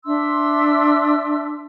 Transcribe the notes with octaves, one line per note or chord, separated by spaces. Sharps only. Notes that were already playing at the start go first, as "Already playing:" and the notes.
D4 E5 C6 E6